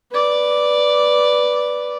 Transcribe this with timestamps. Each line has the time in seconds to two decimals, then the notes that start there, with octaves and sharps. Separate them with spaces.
0.11 B4 D5